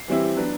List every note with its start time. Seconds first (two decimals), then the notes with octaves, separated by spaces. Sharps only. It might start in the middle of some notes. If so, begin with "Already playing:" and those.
Already playing: C7
0.08 E3 G3 C4 E4
0.36 F#3 B3 D4